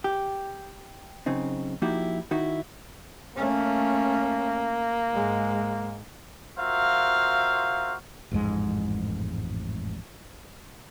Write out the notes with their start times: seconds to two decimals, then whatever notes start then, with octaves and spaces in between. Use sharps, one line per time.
0.04 G4
1.26 F#2 C#3 C4 D#4
1.82 F3 A#3 D#4 E4 F#4 G4
2.31 D#3 D#4 E4 F#4
3.36 A3 A#3 C#4
5.12 G#2 G#3
6.58 F4 F#4 A#4 C5 E5 F5
8.31 A1 F2 G#2 G#3